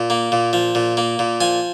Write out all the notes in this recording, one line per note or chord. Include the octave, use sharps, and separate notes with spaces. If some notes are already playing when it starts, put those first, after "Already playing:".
Already playing: A#2
A#3
A#2
F3
A#2
A#3
A#2
F3 G#5